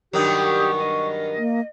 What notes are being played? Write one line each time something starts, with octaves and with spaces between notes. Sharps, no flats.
G2 D#3 F#3 G4 A#4 D#6
C#6
D#5
A#3